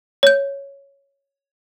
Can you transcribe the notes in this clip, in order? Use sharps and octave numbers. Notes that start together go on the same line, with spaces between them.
C#5 G6